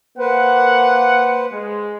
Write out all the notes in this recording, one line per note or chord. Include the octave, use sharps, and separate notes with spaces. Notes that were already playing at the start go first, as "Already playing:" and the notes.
A#3 B4 C5 F#5
G#3